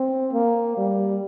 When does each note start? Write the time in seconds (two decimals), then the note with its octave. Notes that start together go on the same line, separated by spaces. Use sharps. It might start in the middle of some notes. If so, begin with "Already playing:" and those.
Already playing: C4
0.33 A#3
0.77 G3